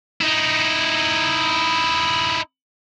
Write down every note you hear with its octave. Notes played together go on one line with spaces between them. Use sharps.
D#4 E4